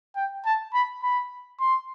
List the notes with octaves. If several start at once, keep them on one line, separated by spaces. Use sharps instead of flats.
G5
A5
B5
B5
C6